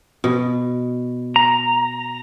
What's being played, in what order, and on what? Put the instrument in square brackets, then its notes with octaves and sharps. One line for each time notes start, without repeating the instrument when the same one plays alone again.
[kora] B2
[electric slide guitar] A#5